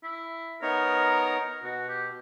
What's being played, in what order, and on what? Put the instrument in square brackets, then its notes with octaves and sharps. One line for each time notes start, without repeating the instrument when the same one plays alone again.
[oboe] E4
[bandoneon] B3 D#4 C#5 [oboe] A#4
[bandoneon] B2 [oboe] F#4
[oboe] G4